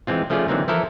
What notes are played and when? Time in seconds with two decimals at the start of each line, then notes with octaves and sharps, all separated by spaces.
0.07 E3 G#3 C4 F4
0.30 F3 A3 C#4 F4 G#4 D5
0.48 D3 E3 F#3 A#3 C4 D#4
0.68 E3 F3 E4 A4 A#4